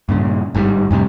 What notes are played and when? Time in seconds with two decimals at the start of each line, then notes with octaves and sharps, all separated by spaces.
0.09 G2 A#2 C#3
0.55 G1 G#2 C#3 G3
0.91 F2 A2 C3 G3